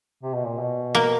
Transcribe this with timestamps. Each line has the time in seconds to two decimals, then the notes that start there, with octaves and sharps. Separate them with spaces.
0.23 C3
0.35 B2
0.47 A#2
0.59 B2
0.95 A#3